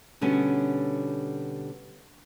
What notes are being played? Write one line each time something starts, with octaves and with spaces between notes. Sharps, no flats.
B2 D3 G3 B3 C#4